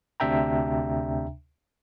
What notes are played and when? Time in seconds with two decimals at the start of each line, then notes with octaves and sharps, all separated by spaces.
0.20 D2 C3 D4 E5 G5 A#5